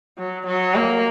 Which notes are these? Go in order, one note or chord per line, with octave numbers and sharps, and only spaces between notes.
F#3
F#3
A#3